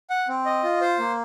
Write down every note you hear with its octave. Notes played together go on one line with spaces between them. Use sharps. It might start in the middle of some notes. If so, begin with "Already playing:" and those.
F#5
C4
D#5
F4
C5
A#3